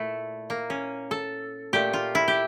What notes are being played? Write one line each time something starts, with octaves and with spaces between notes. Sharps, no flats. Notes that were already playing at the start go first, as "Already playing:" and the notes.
Already playing: A#2 A3 E4
A#3
C#4
A4
A#2 A3 G4
F4
E4
G4